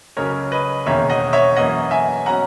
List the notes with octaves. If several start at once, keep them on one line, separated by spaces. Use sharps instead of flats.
C#2 C#3 F#3 C#4 A#4 C#5
B4 D#5
E1 E2 D#3 A#3 C#4 C#5 E5
D#5 F#5
C#5 E5
F#2 E3 A#3 C#4 D#5 F#5
E5 G#5
B2 F#3 C#4 F#5 A#5